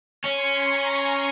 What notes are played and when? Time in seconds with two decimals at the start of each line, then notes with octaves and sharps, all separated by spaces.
0.24 C#4 G#5 C6
0.56 A#5 C#6
0.89 G#5 C6